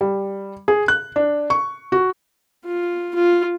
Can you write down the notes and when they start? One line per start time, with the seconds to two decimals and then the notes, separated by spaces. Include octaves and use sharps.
0.01 G3
0.68 G#4
0.88 F#6
1.16 D4
1.50 C#6
1.92 F#4
2.65 F4
3.15 F4